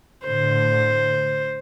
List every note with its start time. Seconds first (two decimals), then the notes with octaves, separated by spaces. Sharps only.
0.25 A2 D3 C5